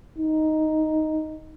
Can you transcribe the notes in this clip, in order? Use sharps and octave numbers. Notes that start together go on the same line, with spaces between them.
D#4